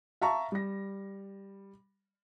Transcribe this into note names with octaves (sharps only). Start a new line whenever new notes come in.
E5 F5 A5 A#5 C#6
G3 A#6